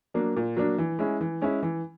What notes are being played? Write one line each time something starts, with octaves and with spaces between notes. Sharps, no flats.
F#3 A#3 D4
A#2
F#3 A#3 D4
E3
G#3 C#4 E4
E3
G#3 C#4 E4
E3